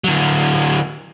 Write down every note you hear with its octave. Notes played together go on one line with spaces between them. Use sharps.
D3 F#3